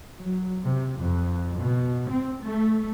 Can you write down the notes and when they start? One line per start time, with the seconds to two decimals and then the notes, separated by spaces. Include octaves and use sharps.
0.20 F#3
0.63 C3
0.98 F2
1.59 B2
2.11 C4
2.43 A3